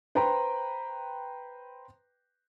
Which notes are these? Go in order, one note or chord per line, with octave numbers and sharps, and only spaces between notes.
B4 C5 G5 A#5 B5